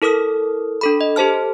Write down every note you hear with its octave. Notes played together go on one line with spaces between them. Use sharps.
E4 A4 A#4 D#6 F6
D4 A4 B5
D#5
G4 A4 C5 A5 F6